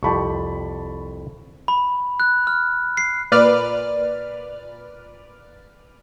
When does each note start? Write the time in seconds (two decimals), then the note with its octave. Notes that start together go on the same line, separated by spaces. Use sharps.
0.03 C2 F2 G4 A5 B5 C#6
1.68 B5
2.20 F#6
2.47 F6
2.97 C7
3.32 A#2 B4 D5 F6